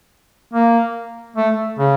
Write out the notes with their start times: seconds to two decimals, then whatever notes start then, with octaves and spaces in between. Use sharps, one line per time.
0.53 A#3
1.37 A3
1.79 C#3